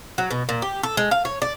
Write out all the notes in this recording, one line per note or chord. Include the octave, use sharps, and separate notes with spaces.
F#3
B2
A#2
G4
A4
G#3
F5
C#5
D5